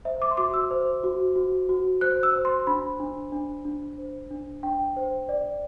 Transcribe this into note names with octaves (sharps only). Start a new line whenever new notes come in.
C5 E5
D6
C6
F#4 D6
E6
C5
F#4
F#4
F#4
C5 F#6
E6
C5
C6
D4 B5
D4
D4
D4
C5
D4
D4 G5
C5
D5